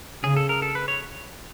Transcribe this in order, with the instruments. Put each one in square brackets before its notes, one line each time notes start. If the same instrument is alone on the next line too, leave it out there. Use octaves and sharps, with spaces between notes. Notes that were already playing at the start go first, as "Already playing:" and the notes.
[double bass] C#3 [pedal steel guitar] G#4
[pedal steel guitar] A4
A#4
A4
B4
C#5